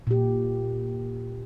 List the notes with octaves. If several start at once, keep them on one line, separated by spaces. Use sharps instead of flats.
A#2 G4